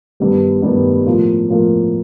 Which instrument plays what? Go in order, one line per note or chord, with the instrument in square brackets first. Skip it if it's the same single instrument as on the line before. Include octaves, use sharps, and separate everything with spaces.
[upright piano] G2 D#3 G3 B3
G2 D#3 G3 B3
A2 F3 A#3
A2 F3 A#3